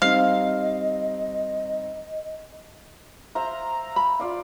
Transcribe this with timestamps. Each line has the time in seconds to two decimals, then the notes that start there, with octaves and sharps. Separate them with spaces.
0.02 G3 C4 D#4 D#5 F5
3.35 C5 E5 F5 A#5
3.96 B5
4.20 F4 D5 F5